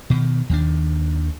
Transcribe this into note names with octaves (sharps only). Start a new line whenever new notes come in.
B2 D#3
D#2 D#3 D4